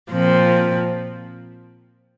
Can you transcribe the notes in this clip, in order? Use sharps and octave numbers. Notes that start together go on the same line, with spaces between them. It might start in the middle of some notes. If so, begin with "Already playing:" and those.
A#2 F3 C4